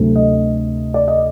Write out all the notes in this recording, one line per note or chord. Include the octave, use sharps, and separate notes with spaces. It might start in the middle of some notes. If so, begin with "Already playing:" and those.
Already playing: D2 C3 F#3 A3
D#5
D5
D#5